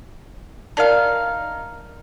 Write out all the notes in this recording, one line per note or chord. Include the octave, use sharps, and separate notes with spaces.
D#4 A#4 D5 F5 A5